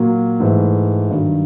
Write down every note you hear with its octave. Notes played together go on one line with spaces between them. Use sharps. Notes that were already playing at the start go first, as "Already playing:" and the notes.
Already playing: A#2 F#3 A#3
G#2 E3 A3
G2 D#3 F#3